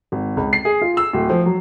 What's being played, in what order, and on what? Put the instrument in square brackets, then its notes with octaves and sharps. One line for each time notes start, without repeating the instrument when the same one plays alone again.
[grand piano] G#1
C#2
C7
G#4
F4
E6
D1
F3
F#3